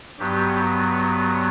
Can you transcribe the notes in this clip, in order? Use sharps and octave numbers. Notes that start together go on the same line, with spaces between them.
G2 F#3 B3 G4